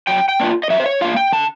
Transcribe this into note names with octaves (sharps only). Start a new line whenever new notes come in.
F#3 G5
G5
A#3 D4 F4
D#5
F#3 E5
C5
C#5
A#3 D4 F4 F5
G5
D3 A5